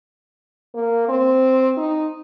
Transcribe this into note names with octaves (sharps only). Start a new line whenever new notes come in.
A#3
C4
D#4